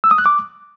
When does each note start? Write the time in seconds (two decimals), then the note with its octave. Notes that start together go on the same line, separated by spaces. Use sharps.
0.04 E6
0.11 D#6
0.18 F#6
0.26 D6